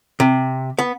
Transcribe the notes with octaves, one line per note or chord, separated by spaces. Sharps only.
C3
B3